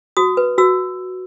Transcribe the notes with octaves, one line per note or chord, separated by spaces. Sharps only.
F#4 D#6
B4
F#4 E6